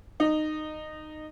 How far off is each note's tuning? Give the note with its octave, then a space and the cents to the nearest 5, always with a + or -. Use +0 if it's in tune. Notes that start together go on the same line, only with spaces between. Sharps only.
D#4 -15